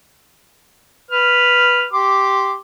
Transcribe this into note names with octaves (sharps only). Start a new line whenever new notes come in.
B4 F6
G4 C6 D6